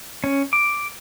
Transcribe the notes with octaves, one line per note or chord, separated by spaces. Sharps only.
C#4
D6